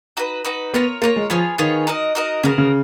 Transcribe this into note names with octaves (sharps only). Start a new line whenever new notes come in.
D#4 F#4 B4
D#4 F#4 B4
B3 F4 A#4 C#5
A#3 F4 A#4 C#5
G#3
F3 B3 F4 G#4 C#5
D#3 B3 F4 G#4 C#5
D#4 F#4 A#4 D#5
D#4 F#4 A#4 D#5
C#3 B3 F#4 A#4
C#3